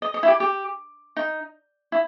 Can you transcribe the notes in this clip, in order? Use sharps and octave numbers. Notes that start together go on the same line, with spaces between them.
D#5
D#5
E4
G4
G4
D#4
E4